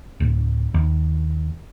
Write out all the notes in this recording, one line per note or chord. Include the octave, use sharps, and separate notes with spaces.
D1
D#2